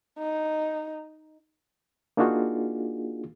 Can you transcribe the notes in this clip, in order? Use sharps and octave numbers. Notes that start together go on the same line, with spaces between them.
D#4
A#3 D4 D#4 F4 F#4 G#4